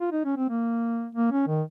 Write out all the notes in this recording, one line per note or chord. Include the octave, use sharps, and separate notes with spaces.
F4
D#4
C#4
C4
A#3
A#3
C#4
D#3